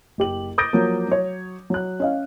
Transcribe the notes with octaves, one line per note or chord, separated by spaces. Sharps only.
F#1 G4 F#7
D6 D#6 G6 A6 A#6 D7
F3 F#3 A#3
F#3 C#5
F#3 F#6
C#4 D#5 F5